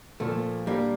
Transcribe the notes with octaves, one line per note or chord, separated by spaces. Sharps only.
A#2 F3 A3
G3 A#3 D4